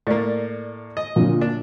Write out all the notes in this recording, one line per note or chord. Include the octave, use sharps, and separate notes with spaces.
A2 A#3 D5 A6
D#5
A#2 D3 F#3
D4